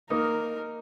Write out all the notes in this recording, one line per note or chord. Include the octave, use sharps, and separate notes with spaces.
A#3 D#4 A#4